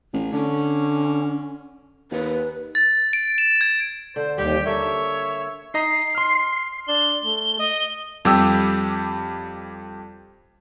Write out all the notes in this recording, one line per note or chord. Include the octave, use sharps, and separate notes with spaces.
A1
D3 C#4
D#2 B4
A6
D7
E7
G#6
D3 C5
D#2 G3 G4
A#3 A4 C#5 E5
D#4 D#5 A#5 C7
C6 F6
D4 G7
A3
D#5
F2 G3 G4 G5 E6